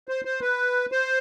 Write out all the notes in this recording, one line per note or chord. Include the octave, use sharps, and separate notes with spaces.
C5
C5
B4
C5